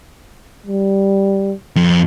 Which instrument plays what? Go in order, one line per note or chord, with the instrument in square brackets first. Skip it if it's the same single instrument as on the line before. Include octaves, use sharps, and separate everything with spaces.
[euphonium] G3
[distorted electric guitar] F2